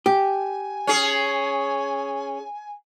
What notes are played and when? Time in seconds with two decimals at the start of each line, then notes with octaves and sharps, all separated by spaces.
0.06 G4 G#5
0.87 C#4 G#4